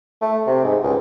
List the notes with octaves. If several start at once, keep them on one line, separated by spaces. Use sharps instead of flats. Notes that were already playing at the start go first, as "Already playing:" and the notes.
A3
C3
G#2
C#2